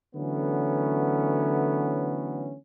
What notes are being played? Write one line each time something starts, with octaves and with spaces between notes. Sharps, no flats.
D3 E3 F#3 A3 B3 C#4